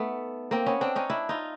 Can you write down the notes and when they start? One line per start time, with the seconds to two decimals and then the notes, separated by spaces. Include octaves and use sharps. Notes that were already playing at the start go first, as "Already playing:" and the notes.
Already playing: A3 B3 D#4
0.51 A#3 C4
0.66 B3 C#4
0.81 C4 D4
0.96 C#4 D#4
1.10 D4 E4
1.29 D#4 F4